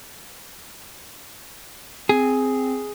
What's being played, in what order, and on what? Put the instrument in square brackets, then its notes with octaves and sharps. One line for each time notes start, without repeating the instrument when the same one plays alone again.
[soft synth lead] C4 [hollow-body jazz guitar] G#4